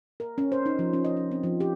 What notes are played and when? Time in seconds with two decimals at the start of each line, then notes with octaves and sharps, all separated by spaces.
0.20 A#4
0.38 C#4
0.52 C5
0.66 D#4
0.79 F3
0.93 C#4
1.05 D#5
1.17 C#4
1.31 C4
1.43 F3
1.60 G4